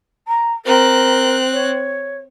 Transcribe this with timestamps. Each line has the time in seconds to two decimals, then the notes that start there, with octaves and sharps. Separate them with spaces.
0.28 A#5
0.65 C4 A#4 F#6
1.52 C#5